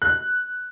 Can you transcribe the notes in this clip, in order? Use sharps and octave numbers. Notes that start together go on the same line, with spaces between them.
F#6